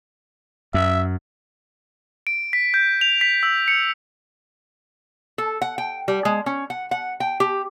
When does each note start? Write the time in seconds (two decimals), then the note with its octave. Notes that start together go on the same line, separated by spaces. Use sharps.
0.74 F#2 E5
2.27 D7
2.53 B6
2.74 G6
3.01 F7
3.21 B6
3.43 E6
3.68 C#7
5.38 A4
5.62 F#5
5.78 G5
6.08 G3
6.25 G#3
6.46 C#4
6.70 F#5
6.91 F#5
7.20 G5
7.40 G4